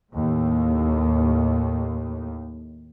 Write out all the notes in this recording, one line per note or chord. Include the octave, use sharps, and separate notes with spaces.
D#2 A2